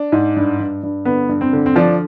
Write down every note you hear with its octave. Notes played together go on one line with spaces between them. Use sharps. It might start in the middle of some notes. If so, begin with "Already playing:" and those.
Already playing: D4
G#2
G2
G2
G2
D3 B3
G2
C4
D3
C4
F3 D4